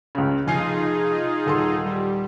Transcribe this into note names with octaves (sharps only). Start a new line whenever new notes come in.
C#2 C#3
F1 D#4 F4 G#4 G#5 C7
D#1 A4 C6
G3